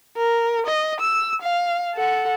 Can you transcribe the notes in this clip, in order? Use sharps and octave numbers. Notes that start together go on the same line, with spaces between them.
A#4
D#5
E6
F5
A4 F#5